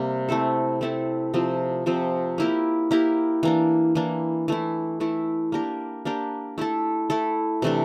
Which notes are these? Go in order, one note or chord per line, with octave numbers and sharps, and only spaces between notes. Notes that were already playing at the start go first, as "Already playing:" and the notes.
Already playing: C3 G3 A#3
A3 C4 E4 A4
A3 C4 E4 A4
C3 F3 C4
C3 F3 C4
A#3 E4 G4 A#4
A#3 E4 G4 A#4
E3 A#3 D4
E3 A#3 D4
E3 A3 E4
E3 A3 E4
A#3 D4 G4 A#4
A#3 D4 G4 A#4
A3 E4 A4
A3 E4 A4
C3 E3 A3 D4